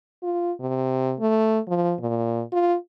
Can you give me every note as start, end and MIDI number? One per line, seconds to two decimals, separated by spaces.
0.23 0.52 65
0.60 1.15 48
1.20 1.59 57
1.68 1.95 53
2.00 2.42 46
2.52 2.75 65